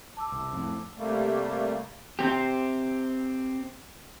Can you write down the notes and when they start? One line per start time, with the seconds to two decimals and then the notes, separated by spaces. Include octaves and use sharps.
0.17 A5 D6 E6
0.32 C2
0.53 F2 A2
0.98 C3 G3 A3 A#3
2.19 C4 G4